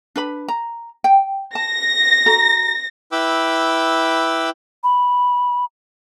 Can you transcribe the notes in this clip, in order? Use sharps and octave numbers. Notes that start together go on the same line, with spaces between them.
D4 B4 B5
A#5
G5
A5 A#6
F#4 A4 A#5
E4 B4 G5 B5 D6 E6
B5